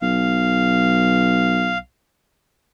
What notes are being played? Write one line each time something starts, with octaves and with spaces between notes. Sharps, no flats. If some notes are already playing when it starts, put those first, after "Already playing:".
B1 F5